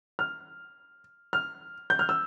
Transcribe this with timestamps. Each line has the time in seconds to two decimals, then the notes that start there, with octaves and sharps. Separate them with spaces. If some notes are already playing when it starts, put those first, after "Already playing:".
0.19 F6
1.33 F6
1.90 G6
1.99 F6
2.09 E6